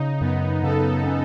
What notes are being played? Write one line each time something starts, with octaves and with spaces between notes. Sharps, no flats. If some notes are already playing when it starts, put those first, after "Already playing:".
Already playing: C#3 D#4
F#2 B3
C#3 A4
C#4